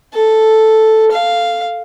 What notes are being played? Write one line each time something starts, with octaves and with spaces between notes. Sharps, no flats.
A4
F5